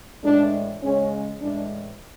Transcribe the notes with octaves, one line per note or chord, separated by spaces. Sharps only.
A2 E3 G#3 D4
C#3 G#3 C#4
A2 E3 G#3 D4